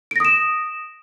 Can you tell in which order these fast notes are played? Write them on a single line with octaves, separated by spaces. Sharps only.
D7 A#6 D#6 E7